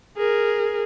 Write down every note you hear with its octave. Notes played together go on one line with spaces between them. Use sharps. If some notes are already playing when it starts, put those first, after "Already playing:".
G#4 A#4